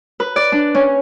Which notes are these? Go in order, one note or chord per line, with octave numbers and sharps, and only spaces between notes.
B4
D5
D4
C#4